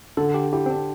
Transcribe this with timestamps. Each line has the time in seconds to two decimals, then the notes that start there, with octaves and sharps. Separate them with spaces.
0.17 D3 A4
0.34 G4
0.53 E4 G4
0.66 C4
0.70 D4